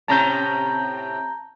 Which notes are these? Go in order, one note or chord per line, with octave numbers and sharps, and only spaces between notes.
A2 C3 C#4 A5 A#5 G6